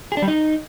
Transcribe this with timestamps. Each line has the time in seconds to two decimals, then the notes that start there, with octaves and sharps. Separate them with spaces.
0.12 G#4
0.17 D4
0.22 G3
0.28 D#4